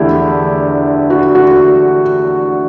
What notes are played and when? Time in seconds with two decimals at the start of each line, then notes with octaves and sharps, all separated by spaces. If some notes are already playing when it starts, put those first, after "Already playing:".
Already playing: E2 D3 A3 E4 G4
1.10 F#4
1.35 F#4